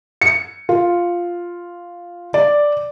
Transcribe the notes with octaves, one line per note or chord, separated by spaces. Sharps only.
C#7
F4
D5